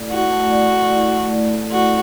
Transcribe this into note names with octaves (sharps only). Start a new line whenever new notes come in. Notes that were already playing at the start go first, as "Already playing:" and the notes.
Already playing: A3 E4 A4 D5
E4 F#4
A3
D5
A4
E4
A3
D5
A4
E4 F#4